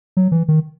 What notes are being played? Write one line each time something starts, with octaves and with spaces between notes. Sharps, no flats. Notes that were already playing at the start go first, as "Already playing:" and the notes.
F#3
E3
D#3